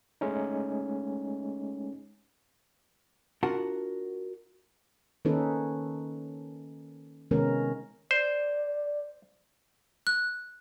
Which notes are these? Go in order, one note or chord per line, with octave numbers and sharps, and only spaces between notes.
G#3 A3 C#4 D#4
D4 F4 F#4 A#4 F#5 A5
D#3 A#3 C#4 D#4 A4 B4
C3 D#3 G#3 B3 C#4 A#4
C5 D5
F#6